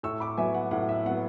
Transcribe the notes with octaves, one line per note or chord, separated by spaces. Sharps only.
A2 C#6 E6
B5 D6
F#3 B3 E5 G#5
F#5
A2 F#5
E5
F#3 B3 F#5